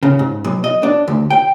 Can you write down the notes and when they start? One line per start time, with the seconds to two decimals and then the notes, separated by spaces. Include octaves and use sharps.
0.03 C#3
0.19 G#2
0.44 B1
0.64 D#5
0.83 D4
1.08 D2
1.30 G5